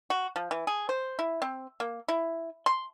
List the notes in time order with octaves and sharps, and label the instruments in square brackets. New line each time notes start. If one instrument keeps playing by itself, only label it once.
[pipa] F#4
F3
E3
G#4
C5
E4
C4
A#3
E4
C6